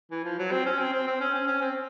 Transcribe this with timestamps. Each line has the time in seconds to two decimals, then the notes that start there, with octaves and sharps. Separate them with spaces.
0.11 E3
0.24 F3
0.39 F#3
0.52 C4
0.66 C#4
0.79 C4
0.93 C4
1.07 C4
1.21 C#4
1.34 C#4
1.47 C#4
1.62 C4